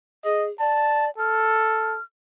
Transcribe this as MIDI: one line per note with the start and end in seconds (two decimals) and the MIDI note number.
0.24 0.50 68
0.24 0.46 75
0.60 1.11 74
0.60 1.06 81
1.18 1.97 69
1.18 2.03 89